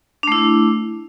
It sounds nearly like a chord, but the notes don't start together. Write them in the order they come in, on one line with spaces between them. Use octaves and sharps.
D4 A3 E4